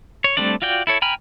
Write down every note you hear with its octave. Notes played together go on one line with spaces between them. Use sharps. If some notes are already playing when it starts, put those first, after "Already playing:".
C#5
G3 A3 C4 D4 D5
F4 F#4 D5 G5
E4 A4 C#5
G5 G#5 A#5 B5 F6